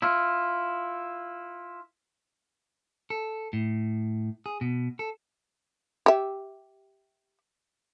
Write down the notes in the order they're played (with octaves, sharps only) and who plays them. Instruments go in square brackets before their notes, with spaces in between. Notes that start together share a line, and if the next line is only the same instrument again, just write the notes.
[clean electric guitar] E4 F4
A4
A2
G#4
B2
A4
[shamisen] G4 E5